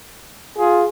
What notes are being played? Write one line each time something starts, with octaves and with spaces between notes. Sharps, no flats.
F4 G#4